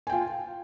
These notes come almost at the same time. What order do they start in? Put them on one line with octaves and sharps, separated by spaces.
G#5 G5 F4